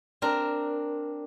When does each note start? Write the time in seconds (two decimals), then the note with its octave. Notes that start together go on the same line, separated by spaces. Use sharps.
0.22 C4 D4 A#4